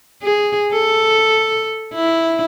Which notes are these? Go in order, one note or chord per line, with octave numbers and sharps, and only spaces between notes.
G#4
A4
E4